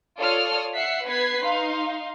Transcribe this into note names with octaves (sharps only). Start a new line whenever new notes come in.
F4 A4 C#5 D5 D#6 F6
E5 F#5 F#6 B6 C7
B3 B4 G#6 B6 C7
D#4 F5 C6